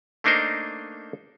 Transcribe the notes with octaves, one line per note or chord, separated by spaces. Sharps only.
A3 A#3 D4 D#4 A#4 C5